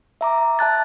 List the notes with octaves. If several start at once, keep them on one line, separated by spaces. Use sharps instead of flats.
E5 A#5 D6
E5 A5 F#6 A6